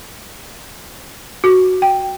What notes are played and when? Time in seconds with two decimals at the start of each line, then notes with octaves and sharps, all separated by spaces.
1.44 F#4
1.82 G5